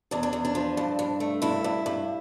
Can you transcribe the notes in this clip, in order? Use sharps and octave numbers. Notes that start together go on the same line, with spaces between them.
E2 D4
D4
E2
D4
F3
G2
G2
A3
G2 E4
G2
G2